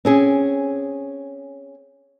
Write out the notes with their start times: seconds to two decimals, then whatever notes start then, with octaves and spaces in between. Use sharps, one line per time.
0.05 C4 C#4 G#4